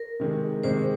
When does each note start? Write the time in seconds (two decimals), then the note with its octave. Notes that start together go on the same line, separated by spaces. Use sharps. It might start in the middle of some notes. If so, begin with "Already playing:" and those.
Already playing: A#4
0.20 C3 D#3 G#3
0.63 C3 D#3 G#3 C5